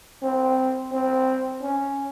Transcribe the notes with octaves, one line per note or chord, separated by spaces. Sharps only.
C4
C4
C#4